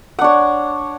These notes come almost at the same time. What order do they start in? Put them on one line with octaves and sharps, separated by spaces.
F#5 D4 C#5